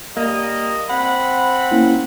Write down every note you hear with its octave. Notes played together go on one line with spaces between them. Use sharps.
G3 A#3 D#5
C4 F#5 B5
A#3 C#4 E4